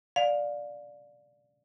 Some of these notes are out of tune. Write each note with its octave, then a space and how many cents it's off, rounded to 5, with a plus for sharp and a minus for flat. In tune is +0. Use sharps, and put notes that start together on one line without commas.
D5 +0 F5 +25